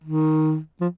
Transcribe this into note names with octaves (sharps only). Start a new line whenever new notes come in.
D#3
F3